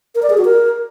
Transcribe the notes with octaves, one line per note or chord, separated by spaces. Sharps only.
A#4
D5
G#4
F#4
A#4